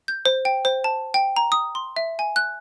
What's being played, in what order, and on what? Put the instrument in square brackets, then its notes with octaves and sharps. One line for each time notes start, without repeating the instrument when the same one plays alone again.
[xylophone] G6
C5
G5
C5
A5
G5
A#5
D#6
C6
E5
G#5
F#6